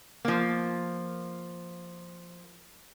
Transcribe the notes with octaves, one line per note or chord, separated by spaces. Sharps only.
F3 A#3